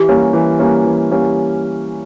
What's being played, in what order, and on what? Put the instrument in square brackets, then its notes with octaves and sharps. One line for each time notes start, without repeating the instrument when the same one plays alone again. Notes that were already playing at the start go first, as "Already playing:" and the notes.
Already playing: [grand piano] E3 [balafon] G4
[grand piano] G3 A#3 C#4
E3
G3 A#3 C#4
E3
G3 A#3 C#4